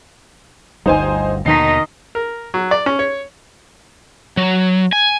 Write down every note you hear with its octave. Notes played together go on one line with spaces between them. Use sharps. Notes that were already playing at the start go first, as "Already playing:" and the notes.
G1 D2 G3 D#4 C5 G#5
D#2 B2 D3 D#3 D#4 D#5 B6 C7
A#4
F#3
D5
C#4
C#5
F#3
G#5